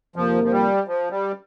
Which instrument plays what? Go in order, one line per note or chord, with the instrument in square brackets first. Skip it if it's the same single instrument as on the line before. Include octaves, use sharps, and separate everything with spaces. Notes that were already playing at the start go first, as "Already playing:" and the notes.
[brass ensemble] F2 C3 D#3 A#3 F4 [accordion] F3
[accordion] F3
G3
F3
G3